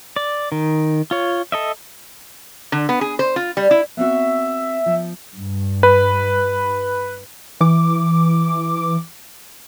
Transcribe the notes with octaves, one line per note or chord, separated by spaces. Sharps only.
D5
D#3
F4 C#5
A4 D#5 E5
D3
B3
G#4
C5
F4
G3
E4
B3 C4 F#4 E5
F3
G2
B4
E3 D6